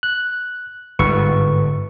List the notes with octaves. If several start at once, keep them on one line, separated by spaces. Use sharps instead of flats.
F#6
G1 G#2 B4 C#6